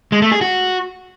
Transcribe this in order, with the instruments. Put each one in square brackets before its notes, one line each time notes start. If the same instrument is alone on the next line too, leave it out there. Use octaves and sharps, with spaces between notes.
[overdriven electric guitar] G#3
A3
G#4
F#4